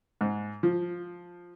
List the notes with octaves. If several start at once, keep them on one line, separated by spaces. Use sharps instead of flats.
G#2
F3